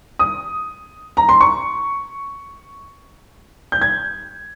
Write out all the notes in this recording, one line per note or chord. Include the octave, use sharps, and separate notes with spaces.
D#6
A#5
C6
C#6
G6
G#6